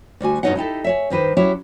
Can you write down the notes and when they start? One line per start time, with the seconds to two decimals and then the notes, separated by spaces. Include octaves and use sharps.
0.21 D2 G3 F#4 G#5
0.43 G2 B2 B3 D#4 C#5 F#5
0.55 D#4 E4 G4 A4
0.84 G#4 C#5 E5
1.10 G2 D#3 B4 C5
1.37 F#3 C#4 E4 G4 C#5